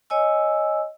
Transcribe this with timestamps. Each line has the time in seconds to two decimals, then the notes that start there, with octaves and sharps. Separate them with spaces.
0.10 C#5 D#5 G#5 E6